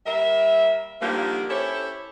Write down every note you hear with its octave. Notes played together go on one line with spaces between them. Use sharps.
G3 A#3 A#4 E5
D3 D#3 F3 G3 A#3
C#4 E4 G4 A4 C5 C#5